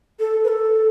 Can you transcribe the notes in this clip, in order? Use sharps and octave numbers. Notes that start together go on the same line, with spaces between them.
A4
B4
A4